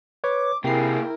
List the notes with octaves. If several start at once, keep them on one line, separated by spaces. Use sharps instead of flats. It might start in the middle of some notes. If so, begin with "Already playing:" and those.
B4 C#5 D6
C3 A#3 E4 G#4 A#4 G5 C7